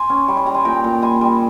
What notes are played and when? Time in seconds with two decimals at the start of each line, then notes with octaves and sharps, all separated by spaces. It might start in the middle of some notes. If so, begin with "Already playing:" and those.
Already playing: G#5 C6
0.10 C#4
0.28 G3 C#6
0.37 C6
0.46 G3 A#5
0.54 G#5 C6
0.65 A#2 G5 A#5
0.84 A#2
1.02 G3 G#5 C6
1.21 G3